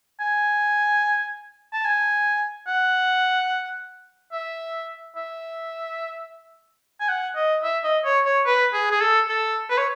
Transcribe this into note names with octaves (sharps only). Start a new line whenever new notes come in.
G#5
A5
G#5
F#5
E5
E5
G#5
F#5
D#5
E5
D#5
C#5
C#5
B4
G#4
G#4
A4
A4
B4
C#5